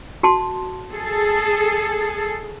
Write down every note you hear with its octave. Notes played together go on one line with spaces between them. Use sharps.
F#4 A5 C6
G#4 A4